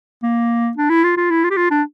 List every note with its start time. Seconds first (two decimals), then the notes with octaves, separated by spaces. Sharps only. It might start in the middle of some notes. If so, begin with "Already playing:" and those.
0.23 A#3
0.77 D4
0.90 E4
1.04 F4
1.17 F4
1.30 E4
1.44 F4
1.50 G4
1.57 F4
1.70 D4